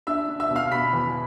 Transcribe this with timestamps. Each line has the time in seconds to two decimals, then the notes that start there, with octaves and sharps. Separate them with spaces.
0.07 D4 E5 E6
0.29 D4
0.40 E5 E6
0.50 B2
0.56 F5 F6
0.72 B2 B5 B6
0.93 E2